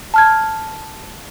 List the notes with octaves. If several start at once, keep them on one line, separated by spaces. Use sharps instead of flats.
A5 F6 G#6